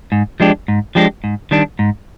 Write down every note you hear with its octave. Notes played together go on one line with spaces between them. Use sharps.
G#2
F3 G#3 D4 G4
G#2
F3 G#3 D4 G4
G#2
D#3 G3 D4
G#2